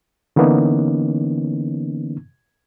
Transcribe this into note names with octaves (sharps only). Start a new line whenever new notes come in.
D3 E3 A#3 B3 C#4 D#4